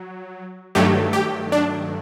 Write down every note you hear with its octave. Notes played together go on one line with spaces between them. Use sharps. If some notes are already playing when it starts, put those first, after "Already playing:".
Already playing: F#3
G2 D#3 F#3 A3 G4
G4
D4